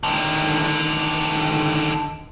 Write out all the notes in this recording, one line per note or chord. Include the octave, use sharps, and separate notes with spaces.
D3 D#3